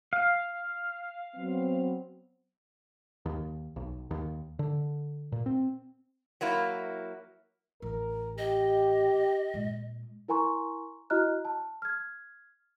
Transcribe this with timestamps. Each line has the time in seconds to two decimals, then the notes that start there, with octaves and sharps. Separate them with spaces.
0.13 F5
1.36 F#3 B3 C4
3.26 D#2
3.76 B1
4.11 D#2
4.59 D3
5.32 A#2
5.46 C4
6.41 F#3 A#3 E4
7.82 A1 A#4
8.38 G4 D#5
9.54 A#2 G#3
10.28 E4 A#4 G#5 A#5 C6 C#6
11.10 E4 F#4 D#5 A#5 F6 F#6
11.45 A5
11.82 F6 G#6